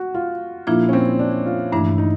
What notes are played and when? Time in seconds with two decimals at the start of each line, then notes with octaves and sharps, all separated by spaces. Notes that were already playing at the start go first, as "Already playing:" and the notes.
Already playing: F#4
0.15 F4
0.67 A#2 F3 A#3 D4 E4 F4
0.89 C#4
0.93 C4
1.19 D4
1.46 F4
1.72 G2 E3 A3 D4 E4
1.98 D#4